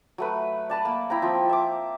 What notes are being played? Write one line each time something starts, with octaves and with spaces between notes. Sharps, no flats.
F#3 A3 B4
D5 A5 B5
A#3
E4 G5 A#5
F3 C4
E5 D6